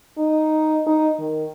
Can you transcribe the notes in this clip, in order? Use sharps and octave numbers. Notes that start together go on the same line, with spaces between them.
D#4
D#4
D#3